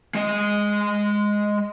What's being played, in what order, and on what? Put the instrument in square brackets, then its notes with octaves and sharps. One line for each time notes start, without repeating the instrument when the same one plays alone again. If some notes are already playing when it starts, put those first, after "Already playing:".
[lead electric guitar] G#3 D#5